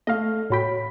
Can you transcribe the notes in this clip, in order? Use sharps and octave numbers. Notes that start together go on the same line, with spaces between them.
A3 D#5 F5 F6
A2 F#4 C#5 G5 B5 B6